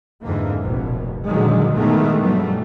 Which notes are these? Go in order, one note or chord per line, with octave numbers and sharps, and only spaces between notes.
F2 G#2 D3 E3 A#3
F1 A#1 B2
A#2 D3 D#3 F3 F#3 G#3
B2 D#3 E3 G#3 A3 B3
G2 B2 E3 F#3 G3 A3